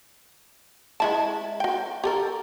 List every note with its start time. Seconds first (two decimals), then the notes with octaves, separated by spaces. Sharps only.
1.00 G#3 E4 A5
1.60 F#4 G5
2.04 G4 A4 A#4